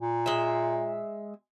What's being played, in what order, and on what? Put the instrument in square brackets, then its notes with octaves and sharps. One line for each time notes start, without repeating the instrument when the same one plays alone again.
[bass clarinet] A#2
[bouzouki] G#3 E5